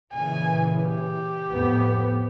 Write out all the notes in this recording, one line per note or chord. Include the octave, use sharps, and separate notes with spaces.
A#2 C#3 E3 G#5
G4
F2 A2 B3